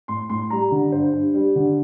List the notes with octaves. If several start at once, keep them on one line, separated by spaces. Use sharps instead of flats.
A2 C6
A2 C6
G3 A#5
D3
G2 C5
G2
G3
D3